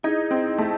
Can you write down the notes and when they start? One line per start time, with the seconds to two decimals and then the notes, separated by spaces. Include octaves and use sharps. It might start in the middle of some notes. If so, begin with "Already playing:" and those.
0.03 D#4 E4 G#4 D#5
0.31 C4
0.58 A3